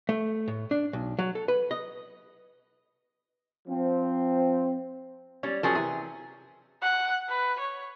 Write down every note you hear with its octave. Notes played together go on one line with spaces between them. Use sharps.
A3
A2
D4
B1
F#3
A4
B4
D#5
F3 C4
G3 C#4
F3 F#3 C#4 G#4 A#4
C3 E3 G#4
F#5
B4
C#5